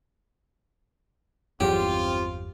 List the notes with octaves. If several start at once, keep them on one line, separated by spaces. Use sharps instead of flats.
G1 E2 F#3 C4 F4 G4